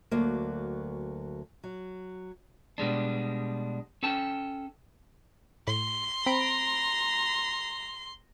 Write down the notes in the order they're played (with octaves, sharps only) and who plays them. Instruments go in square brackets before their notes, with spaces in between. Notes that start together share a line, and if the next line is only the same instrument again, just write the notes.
[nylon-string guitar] D2 F#3 A#3
F#3
[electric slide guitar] B2 G3 G#3 D4
C#4 A4 G5 A5
[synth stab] A2 [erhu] C6
[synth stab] C4 B5 D7 [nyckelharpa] A#5